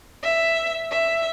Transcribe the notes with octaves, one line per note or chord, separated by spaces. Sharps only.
E5
E5